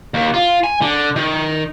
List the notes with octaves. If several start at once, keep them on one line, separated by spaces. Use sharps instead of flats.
D#2
F4
G#5
D3
D#3